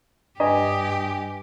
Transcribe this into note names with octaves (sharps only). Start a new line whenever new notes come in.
G2 D4 G4 B4 D#5 G#5